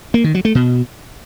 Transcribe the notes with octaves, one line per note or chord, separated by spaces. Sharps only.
A#3
D#3
F#3
A3
B2